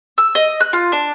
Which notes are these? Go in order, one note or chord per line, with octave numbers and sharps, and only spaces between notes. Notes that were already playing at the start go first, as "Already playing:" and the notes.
E6
D#5
F#6
F4
D4